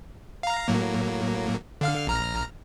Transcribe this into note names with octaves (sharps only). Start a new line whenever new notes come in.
F5 A#5
A2 F#3 A#3
D3 F5 F6
A#1 A#5 F6